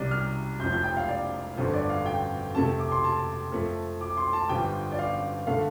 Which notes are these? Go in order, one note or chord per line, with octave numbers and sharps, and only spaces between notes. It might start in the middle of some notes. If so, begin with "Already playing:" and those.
Already playing: C2 C3 G3 D5
F6
F1 F2 F3 G6
G6
G5
F5
D5
G1 F2 D3 C5
D5
F5
G5
F2 C3 A3 A5
D6
C6
A5
F2 F3 A3
D6
C6
A5
G1 G2 F3 G5
D5
F5
D3 A3 F5